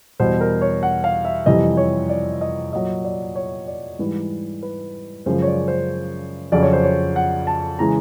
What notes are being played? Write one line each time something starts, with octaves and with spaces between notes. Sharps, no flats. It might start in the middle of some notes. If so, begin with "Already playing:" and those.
E2 B2 G3 C5
A#4
C#5
F#5
F5
E5
F2 C3 E3 G3 D#5
C#5
D5
D#5
A#2 F#3 D#5
D5
C#5
D5
G#2 E3 G3 B4
B4
F#2 C#3 F3 G#3 C5
C#5
D5
C5
F2 C#3 F#3 D5
C#5
C5
C#5
F#5
A5
C#3 E3 G#3 A#5